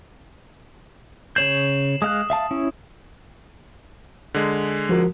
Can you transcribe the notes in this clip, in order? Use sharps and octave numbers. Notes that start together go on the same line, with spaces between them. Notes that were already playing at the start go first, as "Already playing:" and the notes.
C#3 C#5 G6 C7 E7 F#7
G#3 F5 D#6 F#6
E5 F5 A5
C#4 E4
D3 G#3
F3 F#4 A#4